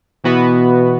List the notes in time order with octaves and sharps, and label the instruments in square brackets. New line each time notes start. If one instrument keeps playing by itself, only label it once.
[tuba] B2 [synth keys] E3 B3 F#4 B4